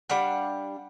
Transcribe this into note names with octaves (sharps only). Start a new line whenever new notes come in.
G3 D4 F5 F#5